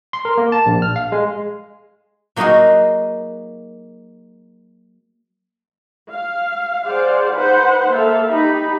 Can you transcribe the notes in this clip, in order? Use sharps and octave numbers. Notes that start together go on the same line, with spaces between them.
C6
A#4
A#3
A5
A#1
F6
F5
G#3
F#3 A#3 D#4 F#4 G#4 A#4
F5
G#4 C5 D5 F5 F#5
D#4 B4 C5 F#5
A#3 A4 E5 F5
D#4 G4 B5